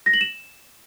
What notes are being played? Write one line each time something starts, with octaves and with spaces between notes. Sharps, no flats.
A#6
F#7
E7